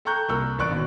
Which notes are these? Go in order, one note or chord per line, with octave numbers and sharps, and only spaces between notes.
A4 G5 A#5 C#6 F#6 G6
C2 A#3 A#4 C#6 E6 F#6
A1 D5 C#6 F#6 D7
D#2 B2